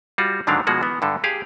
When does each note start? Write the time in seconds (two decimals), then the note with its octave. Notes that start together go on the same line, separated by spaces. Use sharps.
0.18 G3 F4 F#4
0.47 G#2 D3 D#3 F#3 D4 F5
0.67 B2 F3 G#3 A#3 F#4
0.81 E3 B3
1.02 G2 D3 A4
1.24 G4 G#4 F5